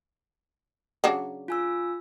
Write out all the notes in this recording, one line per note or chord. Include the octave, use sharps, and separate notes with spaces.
C#3 F#3 D4
F4 G#5 E6